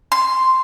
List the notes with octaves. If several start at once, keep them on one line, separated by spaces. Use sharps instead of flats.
C6